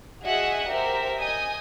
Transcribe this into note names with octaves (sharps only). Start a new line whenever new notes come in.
F#4 G#4 D#5 E5 F#5
G4 A#4 C5 E5
D#5 G#5 D#6 G6